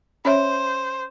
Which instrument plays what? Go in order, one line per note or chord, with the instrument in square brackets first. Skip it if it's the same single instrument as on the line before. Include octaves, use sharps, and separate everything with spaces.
[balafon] C#4 C#5 E5 [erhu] C5